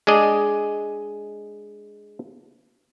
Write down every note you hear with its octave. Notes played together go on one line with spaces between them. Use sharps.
G#3 D4 G#4 D5 D#5